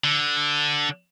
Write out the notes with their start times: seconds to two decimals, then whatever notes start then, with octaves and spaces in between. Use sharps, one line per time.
0.04 D3